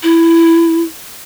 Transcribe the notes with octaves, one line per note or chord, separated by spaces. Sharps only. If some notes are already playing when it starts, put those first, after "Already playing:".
E4